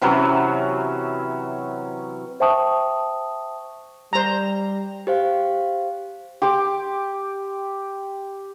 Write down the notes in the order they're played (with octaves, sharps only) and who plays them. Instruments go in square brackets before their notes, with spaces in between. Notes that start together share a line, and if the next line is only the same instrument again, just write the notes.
[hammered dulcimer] C3 E3 F#3 C#4
[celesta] C5 E5 G5 A5 C#6 D#6
[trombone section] G3 [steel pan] C5 A#5
[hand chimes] G4 C5 F5
[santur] G4 C6 D6